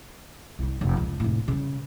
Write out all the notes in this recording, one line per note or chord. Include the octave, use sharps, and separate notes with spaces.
C2 G3
F1
C#2
F1 A2
C#3 G3